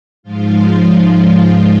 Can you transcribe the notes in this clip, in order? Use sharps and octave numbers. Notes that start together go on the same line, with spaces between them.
G#2 F3 G#3 F4